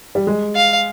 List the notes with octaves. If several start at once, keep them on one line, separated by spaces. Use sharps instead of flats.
G3
G#3
F5